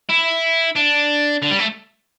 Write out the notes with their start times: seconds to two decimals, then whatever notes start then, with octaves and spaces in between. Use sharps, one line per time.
0.10 E4
0.75 D4
1.42 D3
1.51 G3
1.59 A3